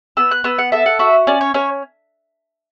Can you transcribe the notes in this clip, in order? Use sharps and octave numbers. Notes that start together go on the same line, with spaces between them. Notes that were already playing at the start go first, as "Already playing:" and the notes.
B3 E6
F#6
B3 E6
F#5
A4 E5
F#5
F#4 E5
C#4 D5
C#5
C#4 C#5